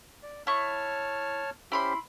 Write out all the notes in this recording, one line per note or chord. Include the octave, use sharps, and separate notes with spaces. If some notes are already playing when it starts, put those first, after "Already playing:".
D5
E4 C#5 A5 C#6 F6
C#4 E4 G4 C5 B5 C6